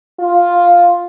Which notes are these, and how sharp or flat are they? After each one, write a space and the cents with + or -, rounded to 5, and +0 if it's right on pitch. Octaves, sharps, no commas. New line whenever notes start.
F4 +5